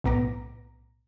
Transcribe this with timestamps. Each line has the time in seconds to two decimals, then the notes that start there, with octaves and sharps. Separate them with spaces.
0.04 B1 A2 B3 A#5 D6 A#6